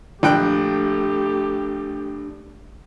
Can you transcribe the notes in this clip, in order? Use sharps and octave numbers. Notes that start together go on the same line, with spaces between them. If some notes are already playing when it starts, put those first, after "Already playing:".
A#1 A3 D4 G4 G5 F#6